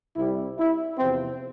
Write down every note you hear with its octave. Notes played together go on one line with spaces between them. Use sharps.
C2 C3 G3 E4
E4
E2 C3 F3 C4